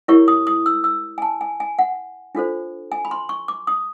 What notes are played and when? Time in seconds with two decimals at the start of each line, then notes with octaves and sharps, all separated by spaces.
0.08 E4 G4 A#4 C#5 C#6
0.28 D#6
0.47 D#6
0.66 E6
0.84 E6
1.18 G#5
1.22 A5
1.41 G#5
1.60 G#5
1.79 F#5
2.35 D4 F4 A4 C5
2.92 G#5
3.05 B5
3.11 C6
3.29 C#6
3.48 D6
3.67 D#6